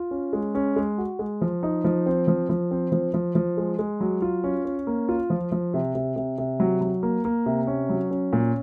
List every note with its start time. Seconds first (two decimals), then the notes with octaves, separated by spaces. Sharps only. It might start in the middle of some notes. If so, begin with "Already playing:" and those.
Already playing: F4
0.11 C#4
0.33 G#3
0.55 C#4
0.76 G#3
0.98 F#4
1.19 G#3
1.41 F3
1.63 D#4
1.84 F3
2.06 C4
2.28 F3
2.49 F3
2.71 C4
2.92 F3
3.14 F3
3.35 F3
3.57 G#3
3.79 G#3
4.01 F#3
4.22 F4
4.44 C#4
4.65 C#4
4.87 A#3
5.09 F4
5.30 F3
5.52 F3
5.74 C3
5.95 C3
6.16 C3
6.38 C3
6.60 F#3
6.81 F#3
7.03 A#3
7.25 A#3
7.46 C3
7.67 C#4
7.89 F#3
8.11 C#4
8.33 A#2